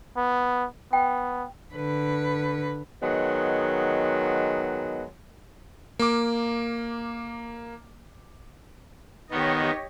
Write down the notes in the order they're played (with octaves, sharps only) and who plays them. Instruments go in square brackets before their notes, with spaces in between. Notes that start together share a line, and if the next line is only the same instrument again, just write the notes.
[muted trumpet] B3
[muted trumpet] B3 [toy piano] G5
[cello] D3 B4
[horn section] D#3 F#3 G#3 B3
[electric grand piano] A#3 D6
[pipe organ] D#3 B3 [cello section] G4 C#5 D#5